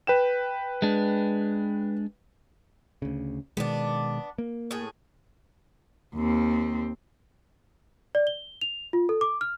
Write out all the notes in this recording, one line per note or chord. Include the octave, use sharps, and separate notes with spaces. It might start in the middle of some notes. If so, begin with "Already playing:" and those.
B4 G5 E7
G#3 D4
D2 C#3
B2 D#3 G#3 B3 D4
A#3
A2 G#4
D#2 C4
D5
G7
F7
F4
A4
D6
F6